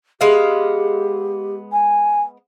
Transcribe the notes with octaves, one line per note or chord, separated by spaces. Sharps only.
G#3 B3 G4 F5
G#5